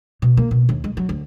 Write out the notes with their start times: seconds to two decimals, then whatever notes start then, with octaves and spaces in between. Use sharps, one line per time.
0.22 B2
0.37 A#3
0.51 B2
0.69 D#2
0.84 G#3
0.97 F#3
1.09 D2